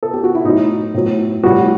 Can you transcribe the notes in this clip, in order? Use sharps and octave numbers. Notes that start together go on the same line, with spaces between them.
A4
G4
F#4
E4
A2 F#3 D#4
A2 F#3
A2 G3 F#4